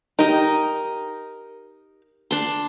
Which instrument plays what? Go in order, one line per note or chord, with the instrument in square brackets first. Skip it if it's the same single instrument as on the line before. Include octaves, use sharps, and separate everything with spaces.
[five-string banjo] D#4 G4 [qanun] A#4 D#5
[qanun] D4 C6